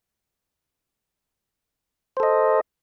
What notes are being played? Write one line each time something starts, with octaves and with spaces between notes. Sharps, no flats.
A4 C5 D#5